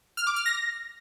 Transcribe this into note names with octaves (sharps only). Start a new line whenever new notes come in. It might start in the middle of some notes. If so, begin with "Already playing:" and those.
F6
D6
F6
A#6